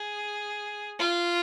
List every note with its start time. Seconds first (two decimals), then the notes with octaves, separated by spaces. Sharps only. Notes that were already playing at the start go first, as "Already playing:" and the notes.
Already playing: G#4
0.99 F4